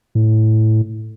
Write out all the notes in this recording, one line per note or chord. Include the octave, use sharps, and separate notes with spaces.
A2